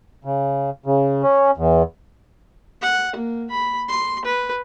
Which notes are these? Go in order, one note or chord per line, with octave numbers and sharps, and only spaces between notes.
C#3
C#3
C#4
E2
F#5
A#3
B5
C6
B4